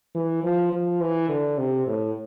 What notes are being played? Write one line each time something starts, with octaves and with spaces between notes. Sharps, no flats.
E3
F3
F3
E3
D3
C3
A2